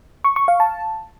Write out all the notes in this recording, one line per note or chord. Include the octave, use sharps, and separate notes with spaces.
C#6
C#6
F5
A5